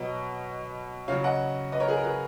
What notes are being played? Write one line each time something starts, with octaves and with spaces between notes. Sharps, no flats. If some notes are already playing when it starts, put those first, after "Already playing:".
Already playing: B2 F#3 B4 D#5
C#3 F#3 C#5 F5
D#5 F#5
B4 D#5
A#4 C#5
G#4 B4
A#4
G#4 B4